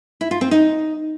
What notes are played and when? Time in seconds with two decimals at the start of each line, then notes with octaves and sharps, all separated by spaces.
0.21 E4
0.31 F4
0.41 C4
0.51 D#4